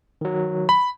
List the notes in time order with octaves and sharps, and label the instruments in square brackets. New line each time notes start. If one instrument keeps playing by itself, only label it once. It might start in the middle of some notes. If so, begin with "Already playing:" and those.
[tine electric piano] D#3 F#3
[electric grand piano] B5